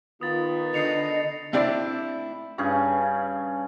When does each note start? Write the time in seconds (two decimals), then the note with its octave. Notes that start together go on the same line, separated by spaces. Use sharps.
0.21 D#3 B3 F4 D#6 A6
0.74 D3 D#5 C7 C#7 F7
1.53 A3 C4 D4 E4 D5
2.58 G2 C#3 C#4 G#4